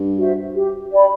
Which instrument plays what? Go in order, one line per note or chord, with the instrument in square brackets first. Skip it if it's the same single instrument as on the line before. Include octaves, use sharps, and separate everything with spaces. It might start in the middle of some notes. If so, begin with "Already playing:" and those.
Already playing: [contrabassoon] G2
[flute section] F#4 C5 E5
G4
D5 G5 B5